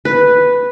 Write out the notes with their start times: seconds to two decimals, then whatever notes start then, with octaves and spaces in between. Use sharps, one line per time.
0.05 B4